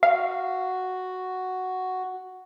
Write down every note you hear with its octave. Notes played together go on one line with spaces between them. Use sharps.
F#4 F5